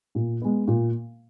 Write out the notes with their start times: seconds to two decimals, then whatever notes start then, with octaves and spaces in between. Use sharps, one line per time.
0.15 A#2
0.42 G#3 B3
0.68 A#2